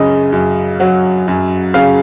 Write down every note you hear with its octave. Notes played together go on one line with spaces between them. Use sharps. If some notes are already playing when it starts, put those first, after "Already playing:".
Already playing: F#2 C#3 D#5
F#2
F#3
F#2
C#3 F5